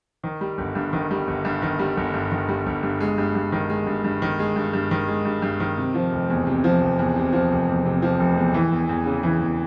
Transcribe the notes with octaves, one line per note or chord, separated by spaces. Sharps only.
D#3
G3
G1
G2
D#3
G3
G1
G2
D#3
G3
G1
G2
D#3
G3
G1
G2
G#3
G2
G2
D#3
G#3
G2
G2
D#3
G#3
G2
G2
D#3
G#3
G2
G2
D#3
C3
F3
F1
E2
C3
F3
F1
E2
C3
F3
F1
E2
C3
F3
F1
E2
E3
E2
E2
C#3
E3
E2